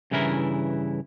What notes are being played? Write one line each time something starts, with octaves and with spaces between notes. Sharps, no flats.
G2 C#3 E3 E4 A#4